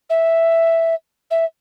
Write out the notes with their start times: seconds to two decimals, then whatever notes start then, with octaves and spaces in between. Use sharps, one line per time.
0.09 E5
1.30 E5